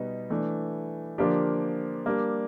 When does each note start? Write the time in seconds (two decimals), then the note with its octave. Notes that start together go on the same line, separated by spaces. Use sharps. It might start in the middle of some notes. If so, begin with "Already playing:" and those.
Already playing: B2 G3 B3 D#4
0.30 E3 A3 D4
1.18 D3 F3 A#3 D4 G4
2.06 G3 A#3 D4